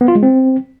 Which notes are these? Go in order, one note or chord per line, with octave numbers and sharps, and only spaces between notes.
B3
F4
G#3
C4